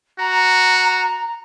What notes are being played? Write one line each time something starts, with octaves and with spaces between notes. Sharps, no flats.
F#4 A#5